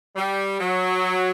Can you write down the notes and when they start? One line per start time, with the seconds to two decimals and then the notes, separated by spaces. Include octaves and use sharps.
0.16 G3
0.60 F#3